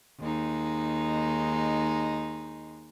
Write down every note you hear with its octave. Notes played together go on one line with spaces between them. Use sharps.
D#2 G#3 D#4